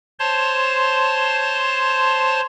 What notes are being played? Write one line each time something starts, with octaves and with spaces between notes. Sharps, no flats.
C5 C#5 A5 C6